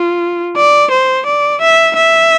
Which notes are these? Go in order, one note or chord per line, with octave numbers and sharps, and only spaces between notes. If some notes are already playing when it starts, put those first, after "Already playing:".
Already playing: F4
D5
C5
D5
E5
E5